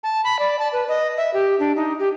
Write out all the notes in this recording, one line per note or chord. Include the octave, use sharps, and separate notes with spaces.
A5
B5
D5
A5
B4
D#5
E5
G4
D4
D#4
G4